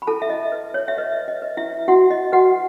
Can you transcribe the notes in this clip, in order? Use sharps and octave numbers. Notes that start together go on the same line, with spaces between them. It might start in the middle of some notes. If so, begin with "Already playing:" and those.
B5
E4 A4 A5
E5
D#5
B4
C#5
E5
B4 D#5
D#5
B4
E4 E5
E4 F#4 F#5
D#5
F#4 B4 F#5